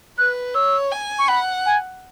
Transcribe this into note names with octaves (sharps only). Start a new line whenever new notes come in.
B4 F#6
C#5 E6
G#5
C#6
F#5 B5
G#5